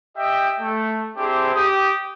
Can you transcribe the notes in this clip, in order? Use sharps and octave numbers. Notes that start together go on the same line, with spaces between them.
G4 D#5 E5 G5
A3
C4 D4 E4 G4 G#4 C5
G4 D#6